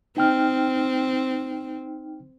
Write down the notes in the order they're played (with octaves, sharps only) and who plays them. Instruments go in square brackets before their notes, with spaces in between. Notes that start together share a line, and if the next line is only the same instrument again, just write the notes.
[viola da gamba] C4 [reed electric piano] D#4 G5 F6